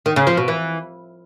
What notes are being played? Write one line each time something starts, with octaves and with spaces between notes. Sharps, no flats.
D#3
C#3
F3
B2
E3